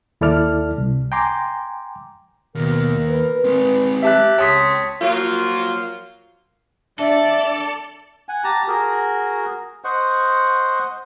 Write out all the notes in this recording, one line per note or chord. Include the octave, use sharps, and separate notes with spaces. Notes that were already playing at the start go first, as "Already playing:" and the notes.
D#2 E4 A4 D5 F6
C2
G5 G#5 A#5 C6 D6
D#2 B2 A#4
B4
G#3 C4
G4 E5 A5 F#6
C#2 C#5 G5 A5 C6 D#6 B6
F3 F#3 A#3 F4
D4 A4 D5 E5
F#5 G#5
G4 A5 A#5
F#4 G#4 A#4
C5 D#5 F#5 C#6